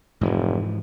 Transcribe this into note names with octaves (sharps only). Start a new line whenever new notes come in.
F1 G#2 E3 F3